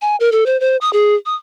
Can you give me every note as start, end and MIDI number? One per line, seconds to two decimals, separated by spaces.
0.02 0.16 80
0.20 0.30 70
0.32 0.44 69
0.46 0.59 72
0.60 0.77 72
0.81 0.92 87
0.93 1.14 68
1.26 1.35 87